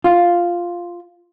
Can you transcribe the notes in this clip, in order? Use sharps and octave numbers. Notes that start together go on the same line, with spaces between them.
F4